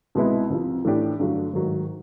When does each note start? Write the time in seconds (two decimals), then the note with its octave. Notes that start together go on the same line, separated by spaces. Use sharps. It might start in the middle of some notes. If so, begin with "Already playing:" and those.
0.15 C2 B2 G#3 B3 E4
0.50 C2 C3 F3
0.85 A2 E3 A3 D4 G4
1.20 G2 D3 F#3 A3 D4
1.53 G#2 D#3 F#3 A3